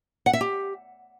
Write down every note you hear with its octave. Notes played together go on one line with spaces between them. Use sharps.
F#5
E5
G4